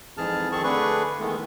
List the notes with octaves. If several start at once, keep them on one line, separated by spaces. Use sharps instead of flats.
F2 G#2 E3 G#4 A5 F6
F2 D#3 C4 G#4 A5 C#6
D3 A3 D4 G#4 B4 C#6
D#3 E3 G#3 A3 B3